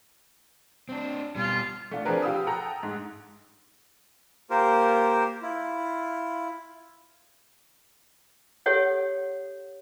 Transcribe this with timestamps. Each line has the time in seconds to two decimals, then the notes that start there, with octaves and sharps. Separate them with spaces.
0.89 C4 D4
1.36 B2 G3 F4
1.91 A3 D4 F4
2.05 F3 C4 D4 G#4 A#4 B4
2.22 F4 G4 F5 B5 D#6 E6
2.47 A4 F#5 G5 A#5
2.83 G#2
4.50 A#3 F4 G4 A#4 C5
5.42 E4 F4
8.66 G4 A4 C#5 F#5